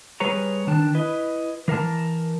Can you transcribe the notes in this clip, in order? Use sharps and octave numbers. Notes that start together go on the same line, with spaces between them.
G3 G#4 B4 C#5 A#5
D#3 D4 A5
E4 B4 D#5
E3 A#4 F5 A5